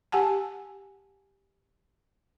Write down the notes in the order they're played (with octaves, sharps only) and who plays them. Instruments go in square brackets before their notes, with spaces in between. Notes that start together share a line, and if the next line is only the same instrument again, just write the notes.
[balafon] G4 F#5 G#5 A5